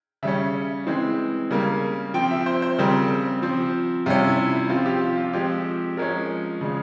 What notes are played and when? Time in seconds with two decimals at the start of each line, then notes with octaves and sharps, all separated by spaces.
0.23 C#3 G3 C#4 E5
0.86 E3 G#3 C4
1.51 C#3 G3 A#3
2.14 F3 C4 G5
2.31 E5
2.46 C5
2.62 C5
2.78 C#3 G3 C4 A#4
3.42 F3 C4
4.06 C3 G3 C#4 F4
4.27 E4
4.48 E4
4.70 F3 C4 F4
4.86 G4
5.01 F4
5.17 F4
5.33 F3 G#3 C4 G4
5.97 F3 G#3 C#4 A#4
6.61 C#3 F3 G#3